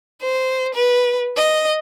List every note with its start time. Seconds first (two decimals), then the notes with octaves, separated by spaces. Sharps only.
0.21 C5
0.74 B4
1.37 D#5